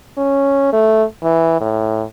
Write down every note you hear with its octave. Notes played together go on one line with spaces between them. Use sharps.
C#4
A3
E3
A2